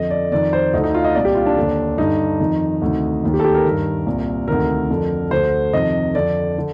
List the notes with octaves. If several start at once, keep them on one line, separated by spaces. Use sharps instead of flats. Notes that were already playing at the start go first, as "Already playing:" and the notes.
Already playing: F2 D3 D#5
D5
F2 D#3 D5
C5
D2 D3 D#4
D#4
F4
D#5
C2 A#2 D5
G4
F4
D4
D#2 D3
G2 D3 D#4
F2 D#3
D2 C3 D#3
D#2 D#3
G4
A4
G4
A#4
G2 D#3
C2 A#2
D2 C3 D#3 A#4
F2 D3
D2 D3 C5
F2 C3 D#3 D#5
F2 D3 D5
D3